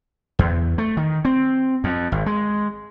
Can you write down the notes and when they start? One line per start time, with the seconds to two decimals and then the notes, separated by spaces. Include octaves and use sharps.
0.39 E2
0.78 A3
0.97 D#3
1.25 C4
1.84 F2
2.12 G#1
2.26 G#3